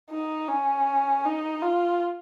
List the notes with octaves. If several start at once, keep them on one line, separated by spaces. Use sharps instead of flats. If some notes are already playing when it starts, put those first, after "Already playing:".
D#4
C#4
D#4
F4